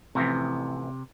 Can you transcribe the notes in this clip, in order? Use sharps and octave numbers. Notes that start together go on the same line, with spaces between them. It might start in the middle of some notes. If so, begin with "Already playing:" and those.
A1 F2 C3 E3